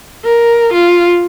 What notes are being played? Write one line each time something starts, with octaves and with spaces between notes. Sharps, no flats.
A#4
F4